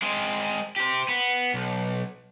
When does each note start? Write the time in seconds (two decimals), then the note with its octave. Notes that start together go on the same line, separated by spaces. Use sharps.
0.02 G#3 C4
0.76 G4 C5
1.08 B3
1.54 B1